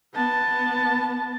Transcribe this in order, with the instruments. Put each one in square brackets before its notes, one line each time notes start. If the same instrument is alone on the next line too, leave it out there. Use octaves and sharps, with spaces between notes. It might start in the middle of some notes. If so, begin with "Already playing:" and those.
[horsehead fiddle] B3 A5